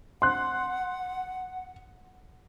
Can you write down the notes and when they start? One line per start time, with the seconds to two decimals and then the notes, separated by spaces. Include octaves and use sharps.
0.22 F#5 C6 F#6